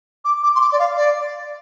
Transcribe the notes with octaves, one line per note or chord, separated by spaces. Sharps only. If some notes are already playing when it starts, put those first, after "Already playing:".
D6
D6
C6
D6
D5
F5
D5